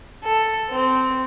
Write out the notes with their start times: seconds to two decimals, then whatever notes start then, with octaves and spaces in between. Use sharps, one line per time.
0.24 A4
0.70 C4